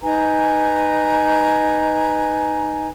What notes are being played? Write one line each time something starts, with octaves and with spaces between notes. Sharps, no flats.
D#4 B4 G#5 A#5